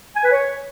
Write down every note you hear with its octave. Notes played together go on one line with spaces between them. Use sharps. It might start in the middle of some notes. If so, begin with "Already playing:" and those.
G#5
B4
C#5